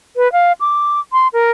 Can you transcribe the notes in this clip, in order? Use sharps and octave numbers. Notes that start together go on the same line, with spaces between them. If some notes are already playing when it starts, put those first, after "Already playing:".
B4
F5
D6
C6
A#4